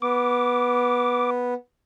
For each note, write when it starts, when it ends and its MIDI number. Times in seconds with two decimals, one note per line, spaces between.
0.02 1.54 59
0.02 1.30 86